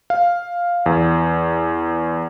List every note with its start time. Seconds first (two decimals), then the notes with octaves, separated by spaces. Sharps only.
0.10 F5
0.86 E2